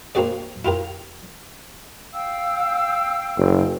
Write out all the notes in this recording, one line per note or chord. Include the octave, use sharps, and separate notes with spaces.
A#3 C4 D4 F#4 G#4 D5
E4 F4 G4 A#4
F5 G5 E6
F#1